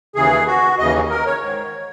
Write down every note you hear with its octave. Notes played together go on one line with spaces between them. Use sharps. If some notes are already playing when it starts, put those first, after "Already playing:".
D#2 C#3 E3 G#4
F#4
D#2 C#3 E3 D#5
A#4
C#5
G#2 D#3